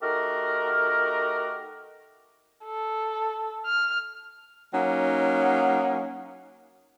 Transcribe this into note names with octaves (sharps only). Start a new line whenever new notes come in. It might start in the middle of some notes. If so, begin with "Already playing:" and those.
A3 D#4 F#4 G4 A#4
A4
F6
F#3 A#3 C#4 D#4